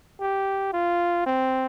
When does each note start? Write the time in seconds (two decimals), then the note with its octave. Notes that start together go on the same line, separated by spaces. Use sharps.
0.21 G4
0.73 F4
1.26 C4